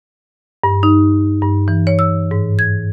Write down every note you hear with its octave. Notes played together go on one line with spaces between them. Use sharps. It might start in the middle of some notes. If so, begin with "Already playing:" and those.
G2
D#4
G2
E3
C#5
E6
G#2
G#6